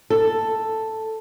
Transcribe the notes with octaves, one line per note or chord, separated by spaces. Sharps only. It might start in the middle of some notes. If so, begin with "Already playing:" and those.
A4